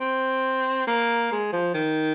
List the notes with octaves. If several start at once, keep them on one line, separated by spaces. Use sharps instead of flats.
C4
A#3
G#3
F3
D#3